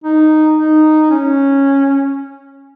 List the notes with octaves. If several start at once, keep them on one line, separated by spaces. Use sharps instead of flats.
D#4
D#4
C#4